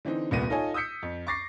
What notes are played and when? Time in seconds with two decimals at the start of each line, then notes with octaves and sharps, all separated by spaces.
0.05 D3 E3 C4 D#4
0.31 D#1 C2 A#2 B3 A#6 D#7
0.50 D#4 F4 A4 C#5 D#5 G#5
0.74 D#6 E6 G6 B6 C#7
1.02 F2
1.27 C#6 D6 A6 A#6 C7